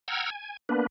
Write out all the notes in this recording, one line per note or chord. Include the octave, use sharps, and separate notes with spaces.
F#5 G5 A#5 E6 F6 G#6
G#5
A#3 B3 D4 B4